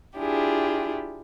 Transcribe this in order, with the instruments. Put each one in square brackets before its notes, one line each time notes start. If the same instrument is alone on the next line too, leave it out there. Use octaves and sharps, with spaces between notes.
[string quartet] D4 E4 F4 G4 G#4